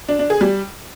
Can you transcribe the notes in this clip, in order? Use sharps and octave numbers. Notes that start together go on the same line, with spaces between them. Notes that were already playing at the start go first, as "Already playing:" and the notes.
D4
D4
G#4
G3